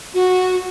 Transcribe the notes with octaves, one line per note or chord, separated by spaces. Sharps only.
F#4